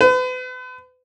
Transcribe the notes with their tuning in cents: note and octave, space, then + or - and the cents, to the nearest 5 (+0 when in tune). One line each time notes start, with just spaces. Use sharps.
B4 +40